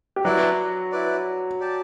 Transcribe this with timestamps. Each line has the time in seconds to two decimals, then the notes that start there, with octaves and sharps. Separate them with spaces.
0.16 G4
0.25 F#3 E4 F#4 B4 D5
0.92 E4 B4 D5
1.60 G4 D5 A5